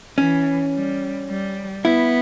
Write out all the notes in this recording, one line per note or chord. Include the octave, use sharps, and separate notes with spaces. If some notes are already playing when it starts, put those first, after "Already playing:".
E3 C#4
G3
G3
B3 E4